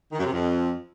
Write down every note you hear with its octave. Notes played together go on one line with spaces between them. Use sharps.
D#3
F#2
C3
F2